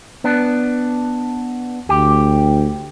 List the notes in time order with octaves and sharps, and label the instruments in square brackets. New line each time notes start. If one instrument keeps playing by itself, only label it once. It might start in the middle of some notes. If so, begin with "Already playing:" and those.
[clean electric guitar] B3 D4
[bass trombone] D2 [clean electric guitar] G4